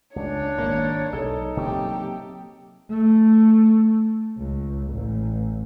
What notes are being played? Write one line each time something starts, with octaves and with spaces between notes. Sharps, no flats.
C#2 D4 C#5
G#1 G#2 A#3
B1 D#4 A4
C3 F#3 A#3 G4
A3
C#2
A1